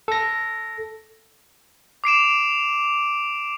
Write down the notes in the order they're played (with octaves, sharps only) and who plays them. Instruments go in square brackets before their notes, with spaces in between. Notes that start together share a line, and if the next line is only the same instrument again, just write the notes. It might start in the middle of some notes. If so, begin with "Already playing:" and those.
[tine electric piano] A4 A#6
[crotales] D6 C7 D7 E7